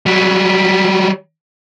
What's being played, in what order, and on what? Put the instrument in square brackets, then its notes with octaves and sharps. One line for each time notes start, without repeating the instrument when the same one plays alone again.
[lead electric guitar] F#3 G3